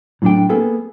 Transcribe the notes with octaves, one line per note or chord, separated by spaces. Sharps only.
A2 F#3 D4 G5
A#3 B3 G#4 A4